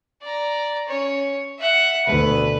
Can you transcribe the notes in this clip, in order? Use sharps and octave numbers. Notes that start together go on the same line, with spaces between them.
D5 A#5
C#4 C#5
E5 F#5
D2 B2 B4